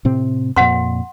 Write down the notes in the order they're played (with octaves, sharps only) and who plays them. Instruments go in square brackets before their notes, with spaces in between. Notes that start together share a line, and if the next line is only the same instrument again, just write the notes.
[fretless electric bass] A2 C3 C4
[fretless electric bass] F2 A#2 [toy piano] F#5 C6